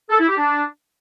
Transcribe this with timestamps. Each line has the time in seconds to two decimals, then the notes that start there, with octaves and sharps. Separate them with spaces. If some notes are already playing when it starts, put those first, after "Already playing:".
0.10 A4
0.19 E4
0.28 G4
0.37 D4